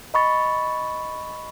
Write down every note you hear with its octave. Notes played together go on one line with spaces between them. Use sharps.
D#5 B5 C#6 A6